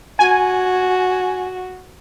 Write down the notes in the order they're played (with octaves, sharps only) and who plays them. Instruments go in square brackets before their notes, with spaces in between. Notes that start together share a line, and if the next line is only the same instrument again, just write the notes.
[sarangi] F#4 [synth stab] G#5